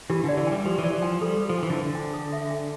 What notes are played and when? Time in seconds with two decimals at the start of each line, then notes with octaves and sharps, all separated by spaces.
0.10 E3 G4
0.24 D3 D5
0.37 E3
0.47 G3 G5
0.65 F3 G4
0.78 E3
0.84 D5
0.91 F3
1.02 G5
1.21 G3 A4
1.40 C5
1.49 F3
1.58 E3 G5
1.70 D3
1.77 C5
1.85 D3
1.95 G5
2.13 A4
2.32 E5
2.51 G5